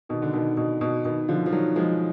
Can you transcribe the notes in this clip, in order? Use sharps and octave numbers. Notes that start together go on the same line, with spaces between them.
B2 D#3
D3
B2 D#3
B2
B2
B2 D#3
D3 F3
F3
D#3 F#3
F3 G#3